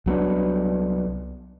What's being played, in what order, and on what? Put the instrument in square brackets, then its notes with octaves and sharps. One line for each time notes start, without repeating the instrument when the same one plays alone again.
[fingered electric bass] C2 F#3 B3 D4